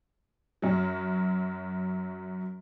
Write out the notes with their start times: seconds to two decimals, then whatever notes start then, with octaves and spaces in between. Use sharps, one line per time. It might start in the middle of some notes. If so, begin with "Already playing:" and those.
0.62 F#2 F#3